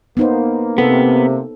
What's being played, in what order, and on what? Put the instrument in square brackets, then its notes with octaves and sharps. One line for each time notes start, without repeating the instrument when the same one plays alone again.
[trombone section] A#3 [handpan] B3 D#4 C5
[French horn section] C3 [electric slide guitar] B3 [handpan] A4